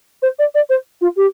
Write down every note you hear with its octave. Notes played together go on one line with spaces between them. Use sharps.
C5
D5
D5
C5
F4
G4